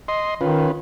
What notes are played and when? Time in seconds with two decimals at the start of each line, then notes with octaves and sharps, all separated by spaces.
0.08 D#5 C6
0.41 D#3 C#4 F4 B4